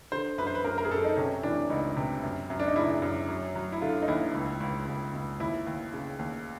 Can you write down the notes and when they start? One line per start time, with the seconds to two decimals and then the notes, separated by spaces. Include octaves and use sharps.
0.12 D3 C5
0.38 F#2 B4
0.47 C5
0.55 B4
0.64 F#2 A#4
0.78 A#4
0.85 G#4
0.91 F#2 A4
1.04 D#4
1.17 C3 C#4
1.43 E3 D4
1.70 C#2 D#4
1.97 C3
2.23 F#2
2.50 F#2
2.60 D4
2.68 D#4
2.76 C#3 E4
3.02 F#2
3.28 F#3
3.55 F#3
3.72 E4
3.81 D3 F4
4.02 D#4
4.08 D#2 E4
4.34 C#2
4.61 C#2
4.87 C#2
5.14 C#2
5.40 D#2 E4
5.67 D#2
5.93 C#3
6.19 D#2